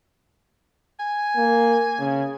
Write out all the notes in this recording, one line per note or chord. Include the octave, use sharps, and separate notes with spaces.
G#5
A#3
C#3